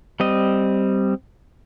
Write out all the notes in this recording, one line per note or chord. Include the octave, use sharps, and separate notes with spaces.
G3 C4 D#5